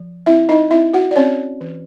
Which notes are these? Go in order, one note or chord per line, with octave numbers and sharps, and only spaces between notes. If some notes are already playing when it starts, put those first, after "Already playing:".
Already playing: F3
C4 E4 E5
D#4 D#5
C4 E4 E5
F#4 F#5
D5
C4 C#4 C#5
E3